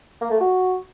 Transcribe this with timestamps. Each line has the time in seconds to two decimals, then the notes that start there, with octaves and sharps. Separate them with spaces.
0.21 A#3
0.31 A3
0.40 F#4